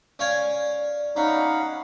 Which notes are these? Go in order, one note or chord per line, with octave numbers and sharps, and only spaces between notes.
C#4 D5 F5 G#5
C#4 D#4 F5 F#5 B5